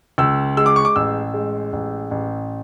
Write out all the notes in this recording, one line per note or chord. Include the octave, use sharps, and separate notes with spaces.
C#2 E6
G#3 E6
D6
C#6
D6
A1 E6
G#3
A1
A1